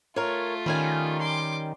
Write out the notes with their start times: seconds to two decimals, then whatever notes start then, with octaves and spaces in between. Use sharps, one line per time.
0.16 A3 F4 A#4 C#5
0.66 D#3 G3 C#4 G#5
1.21 C6 D6